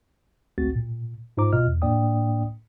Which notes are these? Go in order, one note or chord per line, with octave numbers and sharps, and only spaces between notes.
G#1 C#2 A3 C4 F#4 A6
A#2
G#2 D#4 F4 C5 A#5 D6
C2 B2 F4 D#5 F6
E2
A2 A#3 D4 D5 G5 D#6